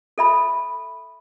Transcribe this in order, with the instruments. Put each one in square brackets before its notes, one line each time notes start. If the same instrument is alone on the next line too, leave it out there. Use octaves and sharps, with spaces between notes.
[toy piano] A4 E5 B5